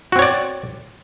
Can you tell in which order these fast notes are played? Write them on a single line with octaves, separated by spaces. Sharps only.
F#4 C4 C#5 D5